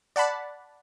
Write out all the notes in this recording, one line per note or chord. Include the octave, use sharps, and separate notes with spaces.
D5 F#5 A5 B5